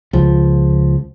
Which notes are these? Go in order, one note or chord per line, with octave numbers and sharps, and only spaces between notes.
C#2 F3